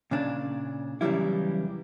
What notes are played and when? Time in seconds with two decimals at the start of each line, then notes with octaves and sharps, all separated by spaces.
0.11 A#2 C#3 D4
1.01 E2 C#3 F#3 G3 E4